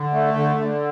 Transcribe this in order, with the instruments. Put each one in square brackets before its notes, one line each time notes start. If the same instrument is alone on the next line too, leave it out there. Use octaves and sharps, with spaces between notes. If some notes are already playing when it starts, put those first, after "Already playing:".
Already playing: [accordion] D3
A3
D3
D3